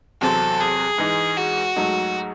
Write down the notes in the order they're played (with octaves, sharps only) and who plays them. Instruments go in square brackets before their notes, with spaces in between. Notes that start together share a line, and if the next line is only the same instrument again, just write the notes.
[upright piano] E2 C3 F#3 C4 [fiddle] A4
[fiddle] G#4
[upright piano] G#2 E3 G#3 D#4
[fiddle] F#4
[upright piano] G#2 F#3 A3 D#4